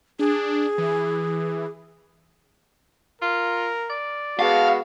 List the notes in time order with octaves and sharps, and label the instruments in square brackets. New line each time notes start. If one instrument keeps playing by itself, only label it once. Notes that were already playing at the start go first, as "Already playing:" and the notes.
[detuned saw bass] D4 [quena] G#4
[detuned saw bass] E3
[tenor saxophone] F4 [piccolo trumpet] A#4
[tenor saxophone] D5
[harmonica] G#3 B3 F#4 [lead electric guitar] F5 [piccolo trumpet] A5